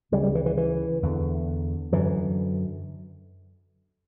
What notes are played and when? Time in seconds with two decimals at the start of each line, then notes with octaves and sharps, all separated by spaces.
0.12 D2 C#3 G3
0.23 G3
0.35 E3
0.46 E3
0.57 E3
1.03 E2 D3
1.92 F#2 D3 E3